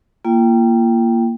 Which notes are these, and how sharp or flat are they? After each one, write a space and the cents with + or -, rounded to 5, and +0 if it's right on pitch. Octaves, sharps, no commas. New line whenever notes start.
A#3 +0 F4 -35 G5 +0